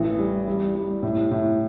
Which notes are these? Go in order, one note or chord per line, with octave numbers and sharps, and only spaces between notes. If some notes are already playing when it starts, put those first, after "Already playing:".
Already playing: A1 E3
G3
G3
G3
A2
A2